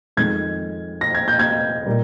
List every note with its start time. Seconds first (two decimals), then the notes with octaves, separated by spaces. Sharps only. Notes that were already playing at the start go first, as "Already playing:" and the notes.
0.17 F2 D#3 G#3 G#6
1.01 A#6
1.15 G#6
1.28 G6
1.39 G#6
1.86 A#2 G3 A#3